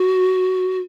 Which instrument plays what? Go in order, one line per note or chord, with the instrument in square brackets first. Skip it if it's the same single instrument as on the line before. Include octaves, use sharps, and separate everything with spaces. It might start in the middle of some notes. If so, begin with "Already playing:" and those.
Already playing: [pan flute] F#4